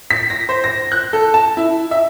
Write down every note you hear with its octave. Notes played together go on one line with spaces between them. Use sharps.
B6
A#6
C5
A#6
F#6
A4
A5
E4
E5